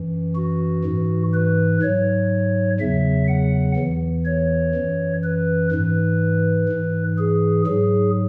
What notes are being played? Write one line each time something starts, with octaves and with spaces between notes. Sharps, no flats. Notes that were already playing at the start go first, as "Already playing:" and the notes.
Already playing: F#2 E3
F#4
G#2 E3
B4
G#2 F#3 C#5
E2 C#3 F#3 E5
F#5
E2 E3
C#5
F#2 E3
B4
G#2 E3 B4
G#2 E3
G#4
G#2 F#3 G#4